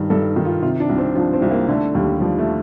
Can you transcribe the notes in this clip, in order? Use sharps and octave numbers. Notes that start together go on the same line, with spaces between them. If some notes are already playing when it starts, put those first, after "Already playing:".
Already playing: G2 D#3
G2 A4
D#3
F4
C3 F4
D4
C2
C4
F3 D4
C4
C2
A#3
D3 A3
D#2 G3
F3 G3
A3